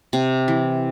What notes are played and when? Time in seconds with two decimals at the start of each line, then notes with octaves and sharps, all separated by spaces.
0.13 C3
0.48 E3